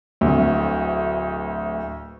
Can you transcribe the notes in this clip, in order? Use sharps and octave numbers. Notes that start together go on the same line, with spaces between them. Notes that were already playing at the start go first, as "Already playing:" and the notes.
D1 D2